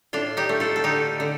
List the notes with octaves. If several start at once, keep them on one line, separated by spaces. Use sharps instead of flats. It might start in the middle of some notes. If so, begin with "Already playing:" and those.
A2 D4 F4
D#4 G4
A3
F4 A4
A4
D3 D#4 G4
D3